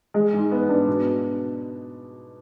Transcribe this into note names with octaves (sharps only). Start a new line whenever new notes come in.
G#3
G#2
B3
D4
B2